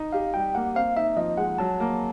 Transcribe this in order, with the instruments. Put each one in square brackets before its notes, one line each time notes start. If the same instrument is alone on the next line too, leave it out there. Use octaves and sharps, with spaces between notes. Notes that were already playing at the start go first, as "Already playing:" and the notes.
Already playing: [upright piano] D#4
[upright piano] G4 [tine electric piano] F5
[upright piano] G3 [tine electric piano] G5
[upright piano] A#3 [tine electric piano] F#5
[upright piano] C4 [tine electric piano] F5
[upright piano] D#4 [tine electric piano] E5
[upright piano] F3 [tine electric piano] D#5
[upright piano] G#3 [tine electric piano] F#5
[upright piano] F#3 [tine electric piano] A5
[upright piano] A#3